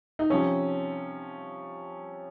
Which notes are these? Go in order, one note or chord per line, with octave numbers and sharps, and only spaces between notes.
D#4
C3 F3 C#4